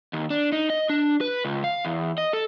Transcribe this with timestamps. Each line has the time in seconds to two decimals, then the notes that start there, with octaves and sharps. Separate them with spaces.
0.13 D#2
0.30 D4
0.52 D#4
0.70 D#5
0.89 D4
1.21 B4
1.45 C#2
1.64 F5
1.85 E2
2.18 D#5
2.33 A4